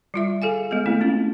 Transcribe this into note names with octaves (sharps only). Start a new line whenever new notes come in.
G3 F4 E5
G#4 A4 F5 G#5
G#3 B3 G#4
A3 B3 C4 E4
C#4 F4